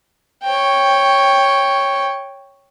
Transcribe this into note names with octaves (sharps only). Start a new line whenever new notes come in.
C#5 G5